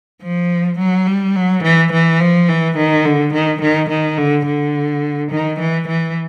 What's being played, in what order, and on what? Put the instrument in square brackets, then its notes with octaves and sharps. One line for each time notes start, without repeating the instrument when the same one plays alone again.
[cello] F3
F#3
G3
F#3
E3
E3
F3
E3
D#3
D3
D#3
D#3
D#3
D3
D3
D#3
E3
E3